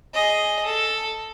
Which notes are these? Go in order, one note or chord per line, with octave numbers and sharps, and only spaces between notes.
G#4 D#5
A4